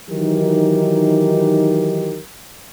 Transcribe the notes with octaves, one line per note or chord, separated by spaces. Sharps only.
D#3 E3 F#3 D#4 G4 A#4